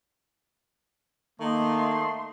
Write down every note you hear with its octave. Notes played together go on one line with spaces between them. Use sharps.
D#3 A3 A#3 D#4 C6